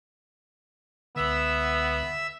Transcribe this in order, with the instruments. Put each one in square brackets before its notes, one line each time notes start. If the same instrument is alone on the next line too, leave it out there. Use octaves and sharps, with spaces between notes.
[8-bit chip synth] C#2 D3 [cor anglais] B3 [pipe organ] E5 E6